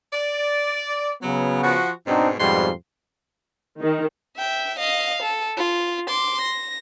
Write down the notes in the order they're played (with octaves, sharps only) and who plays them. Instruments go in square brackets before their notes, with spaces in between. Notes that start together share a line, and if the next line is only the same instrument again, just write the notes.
[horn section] D5
[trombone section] C#3 B3 [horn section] F#3
[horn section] F3 F#4
[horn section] G#2 B2 [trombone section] C4 D4 D#4
[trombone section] F2 G#2 G3 [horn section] B2 C6
[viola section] D#3
[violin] E5 G5
D#5 F5
A4
F4
C6 D6
A#6